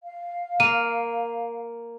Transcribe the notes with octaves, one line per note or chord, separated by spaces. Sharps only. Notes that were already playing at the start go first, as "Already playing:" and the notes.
F5
A#3 D#7